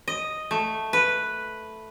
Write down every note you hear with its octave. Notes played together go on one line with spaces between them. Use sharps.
D#5
A3
B4